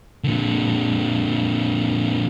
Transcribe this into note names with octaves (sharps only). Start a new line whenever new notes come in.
A#2 D3